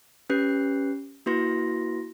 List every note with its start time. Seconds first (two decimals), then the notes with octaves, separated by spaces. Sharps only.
0.30 C#4 G4 B4 F#6 C7
1.26 A#3 E4 F#4 B4 C6 A#6